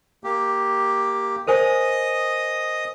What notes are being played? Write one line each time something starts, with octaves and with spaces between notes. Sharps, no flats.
A#3 G4
A#4 C5 D#5 G#5 D#6